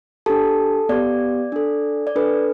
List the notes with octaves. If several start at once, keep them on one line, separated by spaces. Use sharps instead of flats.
D4 G4 A4 A5
B3 G4 D5
D4 A4
D5
D4 A4 B4